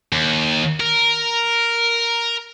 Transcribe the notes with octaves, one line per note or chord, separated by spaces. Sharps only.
D#2
A#4